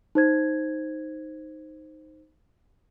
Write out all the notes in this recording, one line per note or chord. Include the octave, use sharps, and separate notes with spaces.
D#4 C5 G#6